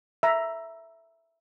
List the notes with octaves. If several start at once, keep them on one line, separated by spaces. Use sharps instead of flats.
E5 A#5